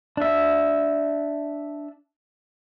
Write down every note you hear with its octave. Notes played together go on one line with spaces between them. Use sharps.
D4 E5